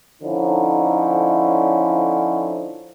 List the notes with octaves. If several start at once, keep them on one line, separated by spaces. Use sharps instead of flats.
D3 F3 C#4 D#4 E4